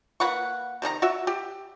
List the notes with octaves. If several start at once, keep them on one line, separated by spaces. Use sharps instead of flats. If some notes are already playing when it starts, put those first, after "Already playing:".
A#3 B4 F#5 C#6
C3 D#3 D4 A#5
F#4 E5
G4